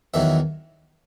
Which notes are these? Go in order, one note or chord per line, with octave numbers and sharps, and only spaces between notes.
E2 D#3 F#3 E5